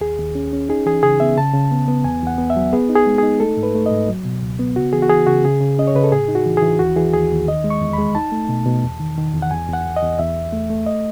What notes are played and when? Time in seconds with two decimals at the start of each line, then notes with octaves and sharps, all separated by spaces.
0.01 D#2 G#4
0.19 D#2
0.35 C#4
0.53 C#4
0.69 D#4 G#4
0.86 E3 G#4
1.03 C#3 G#4
1.20 B3 E5
1.37 C#3 A5
1.53 C#3
1.71 B3
1.88 B3
2.04 E2 G#5
2.22 E2 F#5
2.38 B3
2.50 E5
2.56 F#3
2.73 B3 G#4
2.89 D#4
2.95 G#4
3.07 G#3
3.18 D#4 G#4
3.40 A3 A4
3.57 G#2
3.63 B4
3.75 A3
3.86 D#5
3.92 G#2
4.08 F#3
4.25 B2
4.43 C#2
4.59 B3
4.76 C#3 F#4
4.93 E3 G#4
5.02 F#4
5.10 E3 G#4
5.27 C#3 F#4
5.44 C#3 G#4
5.61 C#3
5.79 C#4 D#5
5.87 C#5
5.95 C#3 B4
6.04 A4
6.12 A2 G#4
6.28 D#4
6.35 F#4
6.46 E3
6.57 G#4
6.62 E3
6.79 D#2 F#4
6.96 E3 G#4
7.13 D#2 G#4
7.31 D#2
7.48 D#3 D#5
7.64 G#3
7.70 C#6
7.81 E2
7.93 B5
7.98 G#3
8.15 D#4 A5
8.32 A3
8.49 B2
8.66 B2
8.83 E2
9.00 D#3
9.17 D#3
9.34 E2
9.42 F#5
9.51 E2 G#5
9.68 E2
9.73 F#5
9.86 E2
9.96 D#5
10.02 E2
10.19 E2 E5
10.36 E2
10.53 A3
10.70 A3
10.86 D#5